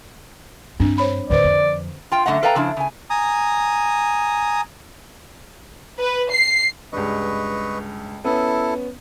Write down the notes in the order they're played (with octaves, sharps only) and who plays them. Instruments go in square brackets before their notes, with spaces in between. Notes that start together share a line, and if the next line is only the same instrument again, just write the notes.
[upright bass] G2 [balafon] C4 D4
[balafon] C5 C#5 B5
[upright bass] D#2 A2 [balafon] D3 B4 C5 [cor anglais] D5
[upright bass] F2
[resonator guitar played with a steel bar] F4 G5
F#2 D3 G3 A3 D#5 F#5
A4 B4 D5 F5 G5 A#5
C#3 F3 D4 E4
C#3 G#5
[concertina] G#5 A#5 D#6
[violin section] B4
C7
[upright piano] C#2 G2 [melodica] B4 D#5 C#6
[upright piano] B3 C#4 [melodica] E4 A4